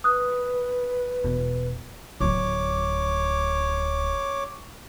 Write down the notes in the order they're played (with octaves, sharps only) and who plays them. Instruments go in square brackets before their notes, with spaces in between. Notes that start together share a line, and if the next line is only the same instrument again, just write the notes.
[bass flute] B4 [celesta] D#6 F#6
[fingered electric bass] E1 B2
[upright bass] D1 D3 [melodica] C#5 D6